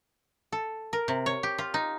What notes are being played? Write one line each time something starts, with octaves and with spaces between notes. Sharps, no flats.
A4
A#4
C3
C#5
G4
F4
D#4